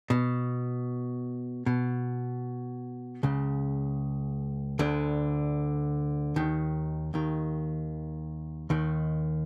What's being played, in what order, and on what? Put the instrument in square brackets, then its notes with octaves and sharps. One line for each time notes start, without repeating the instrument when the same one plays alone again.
[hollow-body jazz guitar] B2
B2
C#2 C#3
D2 D3
D#2 D#3
D#2 D#3
D#2 D#3